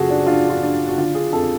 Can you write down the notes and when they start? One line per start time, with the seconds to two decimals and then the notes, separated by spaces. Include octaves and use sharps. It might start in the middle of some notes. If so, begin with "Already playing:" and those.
Already playing: F#1 F3 F#4 G#4 A4
0.09 D4
0.27 D4 F4
0.50 F4
0.62 D4
0.88 F#4
0.97 D3 F4
1.15 G#4
1.33 F2 A4